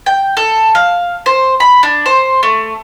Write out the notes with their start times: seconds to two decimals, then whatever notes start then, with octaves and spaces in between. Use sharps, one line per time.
0.06 G5
0.37 A4
0.75 F5
1.26 C5
1.60 B5
1.83 D4
2.06 C5
2.43 A3